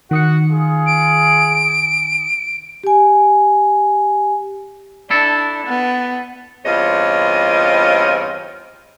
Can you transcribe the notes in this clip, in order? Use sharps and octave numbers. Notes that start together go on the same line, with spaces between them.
D#3 F#4 F#5 D#6 C#7
F4 G#4
D7
G4 G#5
D4 E4 A4
B3
E2 G2 C4 F4 C#5 D#5